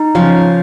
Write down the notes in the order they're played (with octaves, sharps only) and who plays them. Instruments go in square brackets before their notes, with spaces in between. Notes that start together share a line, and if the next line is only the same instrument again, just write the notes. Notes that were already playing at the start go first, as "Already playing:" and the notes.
Already playing: [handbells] D#4
[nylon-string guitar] C#3 F3 C#4 F4